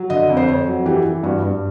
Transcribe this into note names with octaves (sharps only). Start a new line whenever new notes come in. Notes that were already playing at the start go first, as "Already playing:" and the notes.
Already playing: F#3
D3 D#5
F2
C5
F2 C#5
F#3
E3 G4
E3
G2 F#4
G2